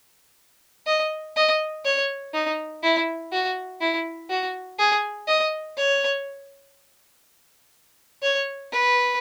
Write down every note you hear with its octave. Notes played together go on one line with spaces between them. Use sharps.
D#5
D#5
C#5
D#4
E4
F#4
E4
F#4
G#4
D#5
C#5
C#5
B4